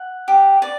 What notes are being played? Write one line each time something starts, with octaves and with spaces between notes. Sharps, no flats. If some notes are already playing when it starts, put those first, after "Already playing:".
Already playing: F#5
G4
D5